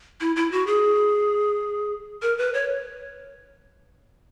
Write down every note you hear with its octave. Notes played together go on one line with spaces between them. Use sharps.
E4
E4
F#4
G#4
A#4
B4
C#5